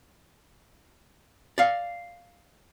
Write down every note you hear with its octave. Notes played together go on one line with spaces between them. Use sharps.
D5 F5